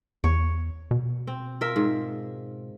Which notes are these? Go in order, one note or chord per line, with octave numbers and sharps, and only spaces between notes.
E2 C#5
B2
C4
F4 A#4 E5
G#2